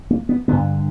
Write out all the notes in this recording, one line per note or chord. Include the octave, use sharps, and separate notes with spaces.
A#3
B3
G2 D3 B3